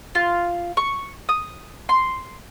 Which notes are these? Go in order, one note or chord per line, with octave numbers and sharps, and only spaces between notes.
F4
C#6
D#6
C6